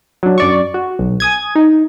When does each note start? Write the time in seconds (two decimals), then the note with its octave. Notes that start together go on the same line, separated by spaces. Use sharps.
0.23 F#3 D4
0.38 F#2 D5 C#6
0.74 F#4
0.99 B1
1.20 G#5 D#6 G#6
1.55 D#4